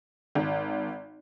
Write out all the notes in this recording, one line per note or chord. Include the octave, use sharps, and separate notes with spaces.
G#1